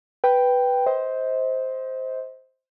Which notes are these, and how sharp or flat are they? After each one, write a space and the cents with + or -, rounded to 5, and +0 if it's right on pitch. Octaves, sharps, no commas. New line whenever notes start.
B4 +0 G5 +0
C5 +0 D#5 +35